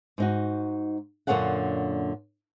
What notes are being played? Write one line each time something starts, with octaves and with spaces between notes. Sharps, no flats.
G#2 D#4 F#4
F#2 A#2 D3 C#5 F5 F#5